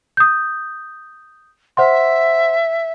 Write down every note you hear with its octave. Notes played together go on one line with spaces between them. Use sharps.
D#6 G6
C5 E5 F#5 C6